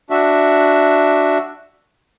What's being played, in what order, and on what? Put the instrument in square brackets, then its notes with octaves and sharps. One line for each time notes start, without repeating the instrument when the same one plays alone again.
[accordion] D4 F#4 E5